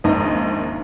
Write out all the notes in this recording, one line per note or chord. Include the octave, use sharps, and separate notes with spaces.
A#1 D#2 G#2 C#3 D#5 A#5